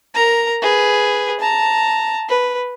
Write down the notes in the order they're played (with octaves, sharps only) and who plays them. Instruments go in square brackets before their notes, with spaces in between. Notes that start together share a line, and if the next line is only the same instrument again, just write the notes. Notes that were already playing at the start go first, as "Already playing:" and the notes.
[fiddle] A#4 A#5
G#4 B4
A5 A#5
B4